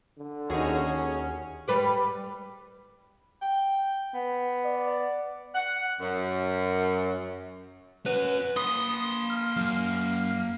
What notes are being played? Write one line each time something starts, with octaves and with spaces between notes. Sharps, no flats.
D3
D#2 C#4 D#4 F#4 G#4
G3 B4 D5
G5
B3
D5
F#5
F#2
C#4 F#4 B4
A#3 B5 C6 D#6
F6
F#2